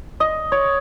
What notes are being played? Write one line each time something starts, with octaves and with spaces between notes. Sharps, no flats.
D#5
C#5